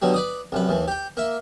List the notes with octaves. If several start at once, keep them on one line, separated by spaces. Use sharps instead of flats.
B2 D3 F#3 G3
B4 D5 D#6
C2 F#2 B4
D#2 E3
G4 G5
A#3 E5